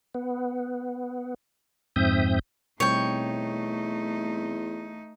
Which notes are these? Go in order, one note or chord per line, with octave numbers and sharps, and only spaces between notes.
B3
F2 G#2 C4 E5 D#6 G6
E2 B2 G3 A3 C4 D#4 C#5 G5